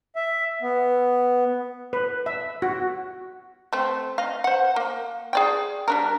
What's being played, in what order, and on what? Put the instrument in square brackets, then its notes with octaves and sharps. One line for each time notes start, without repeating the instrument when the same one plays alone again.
[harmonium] E5
B3
[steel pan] B4
E5
F#4
[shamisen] A3 C4
D#5 F5
C5 F#5
A#3
G#4 D5 G5
G3 D4 A#4